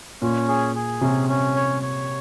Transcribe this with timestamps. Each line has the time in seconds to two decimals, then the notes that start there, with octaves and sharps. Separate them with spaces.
0.22 A#2 C#4
0.49 G#4
0.75 G#4
1.01 C3 C#4
1.29 C#4
1.56 C#5
1.82 C#5